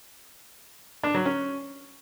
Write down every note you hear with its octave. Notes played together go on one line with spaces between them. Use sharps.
D4
F#3
C#4